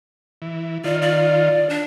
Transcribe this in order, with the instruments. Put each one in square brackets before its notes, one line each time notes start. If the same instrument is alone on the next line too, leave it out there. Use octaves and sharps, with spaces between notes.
[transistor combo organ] E3
[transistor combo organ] D#3 F4 [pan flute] D5
[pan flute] D5
D4